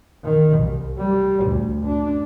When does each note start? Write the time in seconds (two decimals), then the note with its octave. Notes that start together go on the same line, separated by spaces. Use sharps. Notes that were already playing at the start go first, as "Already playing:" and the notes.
0.24 D#3
0.58 C2
0.98 G3
1.45 D2
1.85 D4